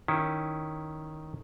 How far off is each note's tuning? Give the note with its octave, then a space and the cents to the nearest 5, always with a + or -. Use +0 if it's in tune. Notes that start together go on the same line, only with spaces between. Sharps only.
D#3 +0 C#4 +0 E4 +0